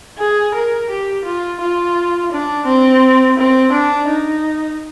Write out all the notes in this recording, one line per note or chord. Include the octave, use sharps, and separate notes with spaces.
G#4
A#4
G4
F4
F4
D4
C4
C4
D4
D#4